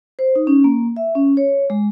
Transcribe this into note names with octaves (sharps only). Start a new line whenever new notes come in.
C5
D#4
C#4
A#3
E5
C#4
C#5
G#3